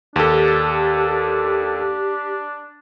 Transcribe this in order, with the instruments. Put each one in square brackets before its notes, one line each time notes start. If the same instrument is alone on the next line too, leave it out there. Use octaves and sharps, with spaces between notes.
[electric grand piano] D#2 A4 [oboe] D4 [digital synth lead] G4